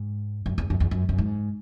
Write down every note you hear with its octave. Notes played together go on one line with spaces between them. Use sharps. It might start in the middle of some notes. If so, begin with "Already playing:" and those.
Already playing: G#2
F#2
E2
F#2
E2
F#2
F#2
G#2